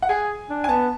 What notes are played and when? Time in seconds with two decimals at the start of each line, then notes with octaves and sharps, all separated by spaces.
0.02 F#5
0.09 G#4 G#5
0.49 D4
0.64 G#5
0.69 B3 A5